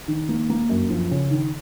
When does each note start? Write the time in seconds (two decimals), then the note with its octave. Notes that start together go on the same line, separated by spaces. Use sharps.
0.08 D#3
0.29 A#3
0.49 A#3
0.69 F#2
0.90 F3
1.11 C#3
1.31 D#3